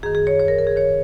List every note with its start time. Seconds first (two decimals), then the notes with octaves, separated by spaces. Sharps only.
0.03 F#2 D#3 G#4
0.15 G#4
0.27 C#5
0.39 C#5
0.48 A#4
0.59 A#4
0.67 G#4
0.76 G#2 D#3 C#5